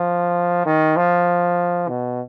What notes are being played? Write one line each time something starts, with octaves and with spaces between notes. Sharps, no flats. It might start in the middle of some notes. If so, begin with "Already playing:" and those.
Already playing: F3
D#3
F3
B2